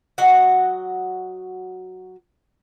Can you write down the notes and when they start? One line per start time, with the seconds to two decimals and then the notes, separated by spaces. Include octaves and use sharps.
0.18 F#3 F#4 D#5 F#5